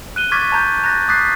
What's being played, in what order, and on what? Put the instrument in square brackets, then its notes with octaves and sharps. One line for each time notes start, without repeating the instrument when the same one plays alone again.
[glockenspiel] F#6 D#7 G7
C#6 D6 F6 G#6 A6 B6
A5 A#5 G6 G#6
A#5 F#6 A6 A#6
D6 D#6 F#6 A6 B6 C7